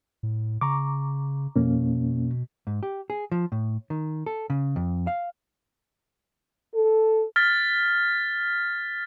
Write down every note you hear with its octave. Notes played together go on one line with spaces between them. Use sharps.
A2
C#3 A#5 C#6 D6
F2 B2 A#3 C#4
G#2
G4
G#4
F3
A2
D#3
A4
C#3
F2
F5
A4
F6 A6 B6